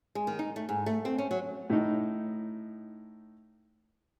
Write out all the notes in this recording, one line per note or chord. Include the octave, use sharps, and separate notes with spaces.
G#3
D#3
D#4
A3
G#2
A3
C4
C#4
F#3
A2 D#4